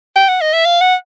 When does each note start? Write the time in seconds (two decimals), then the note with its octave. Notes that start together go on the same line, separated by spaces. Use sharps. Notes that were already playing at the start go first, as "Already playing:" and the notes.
0.16 G5
0.28 F#5
0.41 D#5
0.53 E5
0.65 F5
0.81 F#5